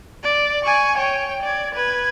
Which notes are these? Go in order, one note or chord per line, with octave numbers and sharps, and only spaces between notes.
D5
G#5 C#6
C#5 G5
D5 G#6
B4 G#6